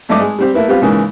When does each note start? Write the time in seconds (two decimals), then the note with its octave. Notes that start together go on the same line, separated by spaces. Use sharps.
0.09 G#1 G2 A3 D#5 D6
0.21 G#3
0.39 G3 C4 G4
0.54 A3 A#3 E4 B4
0.68 G3 B3 C4 F4 G4
0.82 G#2 C#3 E3 G#3 A#3